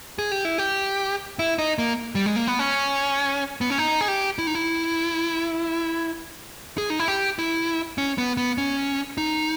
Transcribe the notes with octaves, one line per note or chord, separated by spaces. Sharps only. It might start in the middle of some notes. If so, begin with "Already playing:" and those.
G#4
G4
E4
G4
E4
D#4
A#3
G3
G#3
A#3
B3
C#4
B3
C#4
D#4
G#4
G4
E4
D#4
E4
G#4
D#4
E4
G4
E4
C#4
B3
B3
C#4
D#4